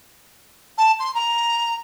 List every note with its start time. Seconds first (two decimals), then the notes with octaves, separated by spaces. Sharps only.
0.77 A5
0.99 C6
1.14 A#5